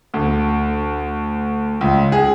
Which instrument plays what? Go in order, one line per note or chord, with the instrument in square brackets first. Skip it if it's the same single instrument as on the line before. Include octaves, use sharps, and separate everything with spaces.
[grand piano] D2
C#2
G#4